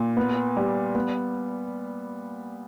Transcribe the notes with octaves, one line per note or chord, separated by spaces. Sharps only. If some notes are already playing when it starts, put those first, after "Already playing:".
Already playing: A#2
B3
G3
B3